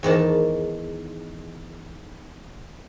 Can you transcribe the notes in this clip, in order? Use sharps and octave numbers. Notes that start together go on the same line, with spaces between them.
E2 G#2 D#3 A5